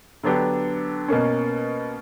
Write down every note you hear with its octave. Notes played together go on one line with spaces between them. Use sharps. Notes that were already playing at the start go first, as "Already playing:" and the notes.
D3 F#3 B3 D4 G4
B2 A#3 C#4